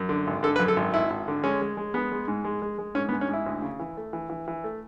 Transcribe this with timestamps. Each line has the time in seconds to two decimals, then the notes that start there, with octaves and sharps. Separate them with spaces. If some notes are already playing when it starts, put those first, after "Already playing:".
Already playing: F#2
0.09 D3
0.27 G#1
0.43 D3 A4
0.56 B4
0.59 F#2
0.68 A4
0.76 G#1
0.94 G#1 E4
1.10 G#1
1.28 D3
1.44 G#3 C#4
1.62 G#3
1.77 G#3
1.94 G#3 B3
2.12 G#3
2.28 G#2
2.44 G#3
2.62 G#3
2.79 G#3
2.95 G#2 C#4
3.09 B3
3.12 G#2
3.21 C#4
3.29 G#2 E4
3.46 D2
3.62 C#3
3.79 E3
3.97 A3
4.13 E3
4.30 E3
4.48 E3
4.64 A3